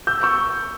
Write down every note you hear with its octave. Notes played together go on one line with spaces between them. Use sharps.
E6 G6
C#6 E6